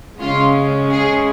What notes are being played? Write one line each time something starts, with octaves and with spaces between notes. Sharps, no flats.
C#3 G#3 C#4 F4
G#4